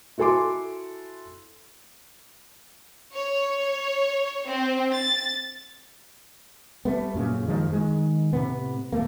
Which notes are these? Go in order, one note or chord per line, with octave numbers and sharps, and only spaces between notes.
E4 F#4 A4 G#5 C6 D6
C#5
C4
A6
G3 A3 B3
F#2 A#2 C#3
F#2 D#3 F3 G#3
D#3 G#3
A2 C3 B3
D#1 A3 A#3